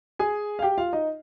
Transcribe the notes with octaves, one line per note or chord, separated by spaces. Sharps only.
G#4 G#5
F5
G4 G5
F4 F5
D#4 D#5